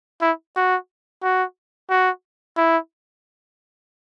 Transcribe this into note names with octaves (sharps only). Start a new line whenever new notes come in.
E4
F#4
F#4
F#4
E4